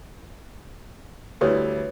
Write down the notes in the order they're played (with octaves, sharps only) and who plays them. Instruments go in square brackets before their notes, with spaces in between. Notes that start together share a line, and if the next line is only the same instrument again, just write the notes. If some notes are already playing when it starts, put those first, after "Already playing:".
[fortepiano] D2 G3 E4 [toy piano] A4 B4 C#5